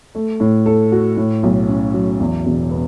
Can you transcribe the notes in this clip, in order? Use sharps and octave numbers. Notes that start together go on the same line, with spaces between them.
A3
A2
A4
F#4
A2
B1
C#4
F#3
E2
E1
B3